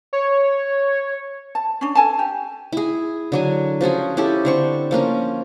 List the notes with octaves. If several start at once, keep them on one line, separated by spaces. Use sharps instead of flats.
C#5
A5
C#4 D4
A4 G#5 A5
G4
E4 G#4
D3 F#3 G#5
F3 C#4 F#4 G#4
C#4 E4 G4 A4
D3 C4 C#6
F3 A#3 C#4 A#4